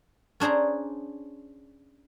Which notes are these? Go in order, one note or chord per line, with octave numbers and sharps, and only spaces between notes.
C#4 D4 G#4 C5 A#5